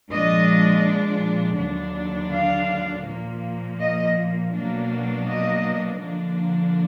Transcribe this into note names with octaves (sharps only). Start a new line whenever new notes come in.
A#2 F3 G#3 D4 D#5
D#2 D3 F#3 D4
F5
A#2 F3 A#3
D#5
B2 F#3 A#3 D4
D#5
D3 F3 A#3 D4